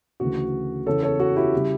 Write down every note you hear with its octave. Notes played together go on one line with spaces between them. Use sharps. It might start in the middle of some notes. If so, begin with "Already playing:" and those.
D2 C#3 E3 A3 F#4
E2 C#3 E3 A4 C#5
A4 C#5
F#4 A4
E4 G4
C#3 G3